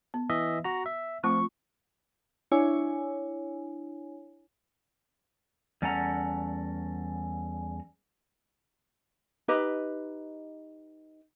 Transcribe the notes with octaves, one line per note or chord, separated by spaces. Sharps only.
B3
E3 D#5 E5
F#4 A#5
E5
F3 A3 C4 F4 C#6
D4 E4 C#5 G#5
E2 G3 C#4 A4 F#5 A#5
D#4 G4 B4 D#5